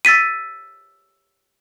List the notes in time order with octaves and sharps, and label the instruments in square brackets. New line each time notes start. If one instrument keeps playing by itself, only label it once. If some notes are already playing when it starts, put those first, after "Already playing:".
[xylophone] E6 A6 B6 D#7